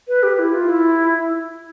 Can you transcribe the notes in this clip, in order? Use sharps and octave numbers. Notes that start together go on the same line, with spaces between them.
B4
G4
E4
F4
E4